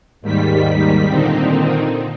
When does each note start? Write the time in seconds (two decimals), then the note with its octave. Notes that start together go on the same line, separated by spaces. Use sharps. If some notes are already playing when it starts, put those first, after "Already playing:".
0.21 D#2 G#2 D#3 G3 B6
1.06 A#2 D3 D#3 C4 D#4